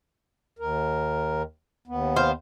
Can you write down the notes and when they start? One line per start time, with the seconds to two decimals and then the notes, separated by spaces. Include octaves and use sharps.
0.59 D#2 A#4
1.88 D#2 B3
2.16 C5 F5